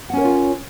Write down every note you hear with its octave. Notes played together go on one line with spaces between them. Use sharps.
C#4 F4 A#4 C#5 F#5